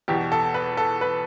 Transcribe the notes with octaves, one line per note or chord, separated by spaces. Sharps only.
E2 B2 G4
A4
B4
A4
B4